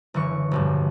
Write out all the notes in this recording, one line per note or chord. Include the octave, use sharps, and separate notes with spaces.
F#1 D3 E3 C#6
F1 B1 G2